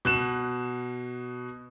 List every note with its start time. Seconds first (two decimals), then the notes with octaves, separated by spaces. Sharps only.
0.05 B2 F#6 E7